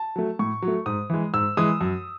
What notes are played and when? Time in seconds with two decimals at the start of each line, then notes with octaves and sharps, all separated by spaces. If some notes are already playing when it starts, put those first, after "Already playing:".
Already playing: A5
0.16 F#3 A3
0.39 A2 C#6
0.62 F#3
0.68 A3
0.86 G#2 D#6
1.10 E3 G#3
1.34 G#2 E6
1.57 E3 G#3 D#6
1.81 F#2